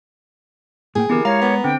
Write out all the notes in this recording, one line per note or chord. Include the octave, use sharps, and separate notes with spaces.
A2 A#3 G#4 G5
D3 E3 B3 E4 G4 A#4
G#3 C#5 F5 A#5
B3
D3 C4 G5